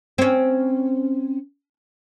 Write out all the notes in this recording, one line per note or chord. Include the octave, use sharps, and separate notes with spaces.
C4 C#4